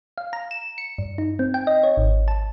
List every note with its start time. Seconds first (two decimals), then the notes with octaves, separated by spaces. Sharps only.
0.18 F5
0.33 A#5
0.51 E7
0.78 C#7
0.98 G2
1.18 D#4
1.39 C4
1.54 G5
1.67 D#5
1.83 C#5
1.97 G#1
2.28 A5